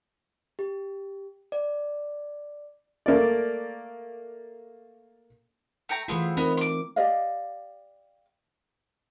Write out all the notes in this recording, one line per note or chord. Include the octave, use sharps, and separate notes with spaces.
G4
D5
A3 A#3 D5
A3 G5 A#5
E3 A3 B3 C4 F4 G#4
B3 C4 D#4 A#4 D#5
C6 D6
G4 D5 D#5 F5